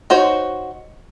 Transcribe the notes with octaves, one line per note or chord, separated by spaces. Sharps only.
D#4 F#4 C5 C#5